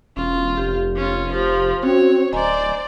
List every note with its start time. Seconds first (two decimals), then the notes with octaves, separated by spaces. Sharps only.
0.17 E1 C#4 F4
0.57 F1 G4
0.96 C#4 F4
1.34 F3 G4
1.83 C4 C#4 F#4 C#5
2.33 D1 C5 D5 D#5 G#5 A#5